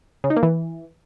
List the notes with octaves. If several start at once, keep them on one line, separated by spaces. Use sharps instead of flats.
C#3
D#4
A#3
E3